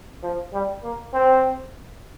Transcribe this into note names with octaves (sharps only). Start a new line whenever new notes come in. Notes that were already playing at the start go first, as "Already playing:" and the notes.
F3
G3
A#3
C4